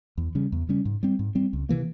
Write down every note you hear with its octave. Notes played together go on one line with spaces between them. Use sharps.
E2
C#3 G3 C#4
E2
C#3 G3 C#4
G#2
G3 C4
G#2
G3 C4
C#2
C3 E3 A#3